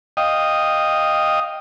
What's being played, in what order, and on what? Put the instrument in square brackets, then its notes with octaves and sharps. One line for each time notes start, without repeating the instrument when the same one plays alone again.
[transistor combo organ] D#5 F5 G5 D#6